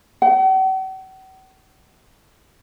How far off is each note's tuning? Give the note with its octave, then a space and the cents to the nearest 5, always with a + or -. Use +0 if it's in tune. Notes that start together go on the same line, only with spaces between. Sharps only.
F#5 +45